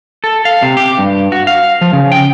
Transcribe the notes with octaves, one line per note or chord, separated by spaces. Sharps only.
A4
F5
C3
G4
G2
F#4
F5
F3
C#3
G5